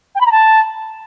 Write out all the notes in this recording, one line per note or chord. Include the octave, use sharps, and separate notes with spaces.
G5
B5
A#5
A5